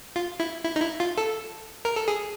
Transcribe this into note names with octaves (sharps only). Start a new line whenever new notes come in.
F4
E4
E4
D#4
E4
F4
A4
A#4
A4
G#4